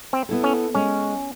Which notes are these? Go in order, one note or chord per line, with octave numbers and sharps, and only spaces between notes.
C4
B3 E4 A4
C#4
G#3 C#4